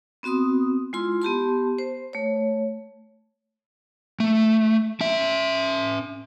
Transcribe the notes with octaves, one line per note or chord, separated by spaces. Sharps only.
B3 C4 F#4 C6 D#6
G#3 E4 F4 C6
B3 G4 A5 C6
C5
A3 C#5
A3
C#4 E5